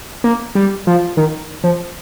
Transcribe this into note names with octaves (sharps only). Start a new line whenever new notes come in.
A#3
G3
F3
D#3
F3